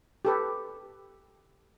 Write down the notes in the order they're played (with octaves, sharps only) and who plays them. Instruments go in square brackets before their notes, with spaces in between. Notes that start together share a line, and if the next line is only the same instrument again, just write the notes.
[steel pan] G4 A4 B4